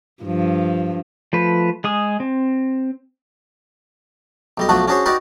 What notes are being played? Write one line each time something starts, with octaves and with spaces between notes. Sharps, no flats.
G2 F3
F3 A3 B4
G#3 G#4 D#6
C4
B1 G3 D#5
B1 F3 A3 D4 F#4 F#5
C#4 D4 F#4 G#4 C5 C#5
D#4 F#4 G4 A#4 B4 D5